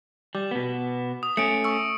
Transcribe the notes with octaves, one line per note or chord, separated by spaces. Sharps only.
G3 D6
B2 B3
D#6
A3 C#4 C#7 D7
C#6 E6